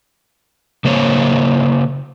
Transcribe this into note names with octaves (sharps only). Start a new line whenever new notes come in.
C#3 A#3 C5 C#5